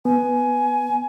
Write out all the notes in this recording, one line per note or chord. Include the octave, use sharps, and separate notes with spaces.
B3 G#5